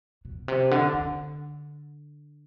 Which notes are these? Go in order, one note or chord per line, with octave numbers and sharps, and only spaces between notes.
B2
C3
D3
D3